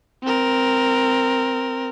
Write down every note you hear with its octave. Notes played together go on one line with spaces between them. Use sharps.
C4 A#4